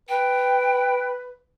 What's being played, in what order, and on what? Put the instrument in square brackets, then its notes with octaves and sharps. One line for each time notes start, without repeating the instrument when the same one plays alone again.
[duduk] B4 [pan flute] G5